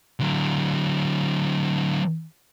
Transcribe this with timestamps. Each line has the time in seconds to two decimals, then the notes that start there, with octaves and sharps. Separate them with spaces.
0.20 D3 F#3